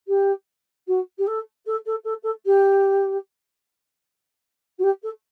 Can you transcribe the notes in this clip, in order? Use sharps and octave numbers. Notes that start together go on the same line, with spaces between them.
G4
F#4
G4
A4
A4
A4
A4
A4
G4
F#4
G4
A4